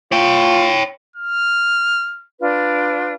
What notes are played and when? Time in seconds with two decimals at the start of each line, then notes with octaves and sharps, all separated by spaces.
0.12 F4 C#5 G5
1.16 F6
2.41 D4 F4 B4 D5